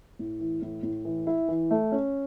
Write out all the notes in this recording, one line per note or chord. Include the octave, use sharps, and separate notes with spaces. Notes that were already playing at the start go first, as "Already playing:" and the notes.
A2
E3
A2
A2
E3
E4
E3
A3
C#4